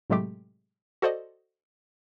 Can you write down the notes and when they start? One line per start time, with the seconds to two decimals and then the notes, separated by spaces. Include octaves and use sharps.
0.10 A2 C3 F#3 G#3 A3 G4
1.02 F#4 A4 C5 D5 D#5